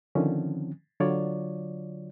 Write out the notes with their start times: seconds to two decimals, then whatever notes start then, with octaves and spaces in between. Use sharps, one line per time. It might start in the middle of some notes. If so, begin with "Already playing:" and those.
0.15 D3 D#3 F3 C4 C#4
1.00 D3 F#3 F4 C#5 D5